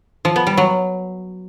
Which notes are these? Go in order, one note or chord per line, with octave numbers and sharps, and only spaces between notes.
F3
B3
G3
F#3